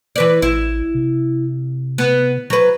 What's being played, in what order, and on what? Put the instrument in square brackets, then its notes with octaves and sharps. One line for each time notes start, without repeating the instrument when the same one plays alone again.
[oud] E3 B4 D5
[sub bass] A1 [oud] E4
[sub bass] C3
[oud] B3
F#3 B4